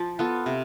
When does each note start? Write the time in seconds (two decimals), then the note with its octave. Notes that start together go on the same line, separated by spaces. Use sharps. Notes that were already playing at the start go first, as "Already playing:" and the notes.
Already playing: F3
0.19 B3 F4 A4
0.46 C3